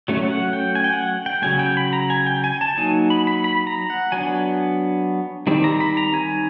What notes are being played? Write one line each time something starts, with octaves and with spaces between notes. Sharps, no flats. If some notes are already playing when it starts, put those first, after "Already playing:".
F#3 A3 C#4
F#5
G5
G#5
G5
F#5
G5
C#3 F#3 A3 G#5
G5
B5
A#5
G#5
G5
G#5
A5
F#3 A#3 D#4 G#5
B5
B5
B5
A#5
F#5
F#3 B3 D4 G#5
D#3 G3 C4
A#5
B5
A#5
G#5